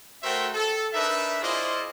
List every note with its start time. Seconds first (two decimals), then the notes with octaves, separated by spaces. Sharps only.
0.23 A3 F#4 A#4 C5 E5 G5
0.54 A4
0.93 D4 D#4 A#4 B4 E5
1.41 E4 F4 G#4 C5 D5 D#5